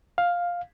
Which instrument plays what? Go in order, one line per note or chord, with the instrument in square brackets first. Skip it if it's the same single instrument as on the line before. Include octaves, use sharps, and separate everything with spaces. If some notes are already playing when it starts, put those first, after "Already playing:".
[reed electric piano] F5